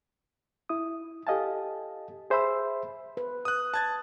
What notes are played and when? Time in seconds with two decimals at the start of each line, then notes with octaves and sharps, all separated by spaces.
0.69 E4 D#6
1.27 G4 A4 D#5 F5 G#5 A5
2.30 G#4 C5 E5 B5 C6 E6
3.17 B4
3.45 D#6 F#6
3.74 A5 G#6 A6